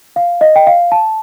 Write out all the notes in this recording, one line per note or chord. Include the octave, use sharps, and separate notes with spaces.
F5
D#5
G5
F5
A5